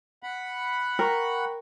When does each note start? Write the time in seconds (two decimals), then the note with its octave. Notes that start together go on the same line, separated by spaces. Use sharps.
0.23 F#5 B5
0.99 A#4 G5 A#5 C#6